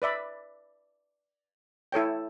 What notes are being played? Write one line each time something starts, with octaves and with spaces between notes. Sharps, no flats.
B4 D5 E5 B5
E4 A4 C#5 G5